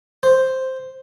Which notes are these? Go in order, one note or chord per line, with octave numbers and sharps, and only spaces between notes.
C5